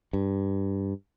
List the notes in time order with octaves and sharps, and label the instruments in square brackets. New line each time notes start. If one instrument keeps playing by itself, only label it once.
[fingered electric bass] G2